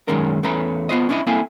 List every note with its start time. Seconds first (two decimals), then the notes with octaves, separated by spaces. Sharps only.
0.08 B1 F#2 D#3 G#3 C#4 A#4
0.43 E2 A3 C#4 B4 A#5
0.89 B3 F4 C5 D#5
1.09 C#4 D4 E4 C#5 D#5
1.27 A#3 C4 E4 A4 F5 G#5